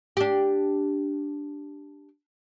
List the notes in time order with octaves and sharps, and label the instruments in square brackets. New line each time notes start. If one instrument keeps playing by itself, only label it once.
[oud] D4 G4